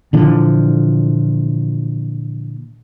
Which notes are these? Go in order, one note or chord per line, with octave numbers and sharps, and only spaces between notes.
A#2 D3 E3 F3